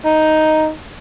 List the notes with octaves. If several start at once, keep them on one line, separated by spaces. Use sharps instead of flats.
D#4